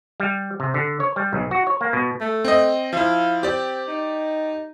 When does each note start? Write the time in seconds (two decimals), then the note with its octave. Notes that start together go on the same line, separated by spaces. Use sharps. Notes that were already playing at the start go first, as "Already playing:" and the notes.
0.20 G3
0.60 C3
0.74 D3
1.00 C#5
1.16 G3
1.33 B1
1.51 F#4
1.67 C#5
1.81 A#3
1.93 B2
2.21 A3
2.45 C4 D#5
2.93 F3 E4 F5
3.43 C4 G4 D5
3.88 D#4